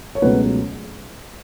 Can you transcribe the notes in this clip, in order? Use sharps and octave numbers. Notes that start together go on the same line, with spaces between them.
C#5
C#2 B2 F#3 A3 F#4 B4